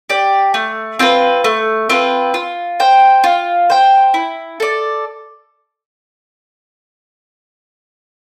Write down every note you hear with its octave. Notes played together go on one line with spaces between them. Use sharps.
G4 D5
A3
C4 F4 B4
A3
C4 F4 B4
F4
C5 G5
F4
C5 G5
E4
A4 D5